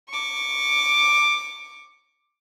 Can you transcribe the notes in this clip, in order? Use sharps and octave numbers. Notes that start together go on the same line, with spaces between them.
C#6 D6